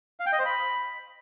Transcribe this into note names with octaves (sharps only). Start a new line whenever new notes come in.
F5
G5
D#5
C5
B5